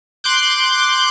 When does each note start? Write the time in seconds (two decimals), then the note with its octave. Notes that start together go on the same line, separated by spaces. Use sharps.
0.24 C6 D6 F#6 G6